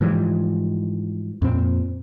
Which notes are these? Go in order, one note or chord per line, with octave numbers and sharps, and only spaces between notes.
G#2 E3 F3 G3
F2 A#2 C4